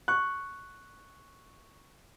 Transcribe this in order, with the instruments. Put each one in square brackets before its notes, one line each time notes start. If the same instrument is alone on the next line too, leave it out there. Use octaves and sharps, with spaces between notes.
[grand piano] C#6 F#6